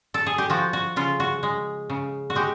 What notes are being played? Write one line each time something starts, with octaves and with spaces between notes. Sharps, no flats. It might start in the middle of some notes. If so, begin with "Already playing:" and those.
A4
G#4
G4
F3 F#4
F#4
C#3 F4
F#4
G#3
C#3
F#4
G#3 G4